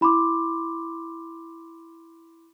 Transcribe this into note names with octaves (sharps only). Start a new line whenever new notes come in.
E4 B5 C6 D6